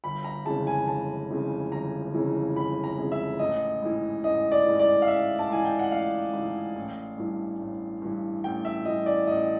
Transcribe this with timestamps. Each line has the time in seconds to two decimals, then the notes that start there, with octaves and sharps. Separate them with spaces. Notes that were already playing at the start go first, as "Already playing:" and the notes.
0.04 G1 B5
0.24 A#5
0.45 F2 C#3 E3 G#3 A5
0.67 G#5
0.88 G1 A5
1.30 F2 C#3 E3 G#3
1.72 G1 A#5
2.14 F2 C#3 E3 G#3
2.55 G1 B5
2.84 A#5
2.98 F2 C#3 E3 G#3
3.12 E5
3.39 A1 D#5
3.82 G#2 E3
4.24 A1 D#5
4.52 D5
4.66 G#2 E3
4.79 D5
5.02 F5
5.07 A1 E5
5.39 A5
5.50 G#2 E3 G#5
5.65 G5
5.79 F#5
5.91 A1 F5
6.33 G#2 E3
6.76 A1
7.18 G2 E3
7.60 A1
8.02 G2 E3
8.44 A1 G5
8.65 E5
8.85 G2 E3 D#5
9.06 D5
9.27 A1 D#5